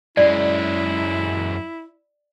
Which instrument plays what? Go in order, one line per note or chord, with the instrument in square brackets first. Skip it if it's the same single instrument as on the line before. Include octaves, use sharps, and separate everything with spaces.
[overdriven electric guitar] F#2 G#3 [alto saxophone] E4 [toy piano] D5